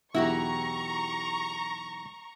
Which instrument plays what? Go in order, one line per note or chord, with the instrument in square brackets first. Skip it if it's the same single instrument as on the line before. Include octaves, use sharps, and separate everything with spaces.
[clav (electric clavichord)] B1 E2 [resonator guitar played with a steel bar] E4 F#4 G4 [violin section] A#5 C#6